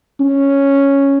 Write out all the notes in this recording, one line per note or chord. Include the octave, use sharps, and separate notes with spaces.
C#4